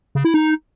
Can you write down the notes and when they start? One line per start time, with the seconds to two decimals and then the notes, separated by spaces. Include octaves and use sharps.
0.15 C#3
0.25 E4
0.34 D#4